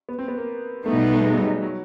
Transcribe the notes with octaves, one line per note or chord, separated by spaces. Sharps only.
B3
C4
B3
A#3
B2 G3 A3 B3 D#4
A3
G#3
F#3
G3
F#3